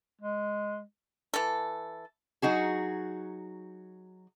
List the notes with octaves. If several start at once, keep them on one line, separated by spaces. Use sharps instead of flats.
G#3
E3 A4
F#3 D#4 F#4 G#4